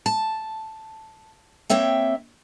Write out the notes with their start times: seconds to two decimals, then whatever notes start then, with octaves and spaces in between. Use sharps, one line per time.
0.06 A5
1.70 A#3 C4 C#5 E5 G5